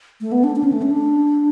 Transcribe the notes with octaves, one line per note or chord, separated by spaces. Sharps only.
A3
B3
D4
D4
C#4
A3
C#4
D4